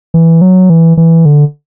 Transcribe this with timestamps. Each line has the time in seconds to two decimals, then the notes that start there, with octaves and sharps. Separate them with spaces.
0.14 E3
0.41 F#3
0.70 E3
0.97 E3
1.25 D3